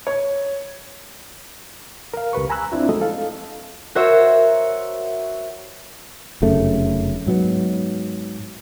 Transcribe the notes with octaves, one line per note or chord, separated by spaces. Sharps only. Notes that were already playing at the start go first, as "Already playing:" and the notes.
C#5
A#4 F5
C#2 G4 B4 C#6
G#5 A#5 B5 E6 F#6
C4 D4 E4 F4
F3 G#3 A3 F#4 A4 D#5
A4 F5
F#4 A#4 C5 C#5 E5
F1 F#2 C#3 A3
G#2 F#3 B3